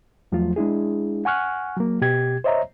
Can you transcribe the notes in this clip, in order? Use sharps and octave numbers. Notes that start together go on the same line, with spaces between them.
E2 F3 F#3 A3 F4
G#3 D4 E4 G#4
F#5 G#5 C#6 F6 F#6
F#3 A#3
B2 G4 G#6
C5 C#5 D#5 E5 A#5